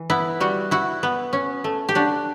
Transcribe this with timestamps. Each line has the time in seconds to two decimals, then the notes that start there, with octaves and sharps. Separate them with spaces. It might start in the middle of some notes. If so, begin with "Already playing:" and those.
Already playing: E3
0.10 B3 E4
0.40 G3 F#4
0.71 E4 F#4
1.03 B3
1.33 C#4
1.64 A3
1.89 G4
1.95 D4 F#4